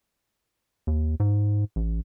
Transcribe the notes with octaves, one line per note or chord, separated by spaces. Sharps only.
D#2
G#2
A1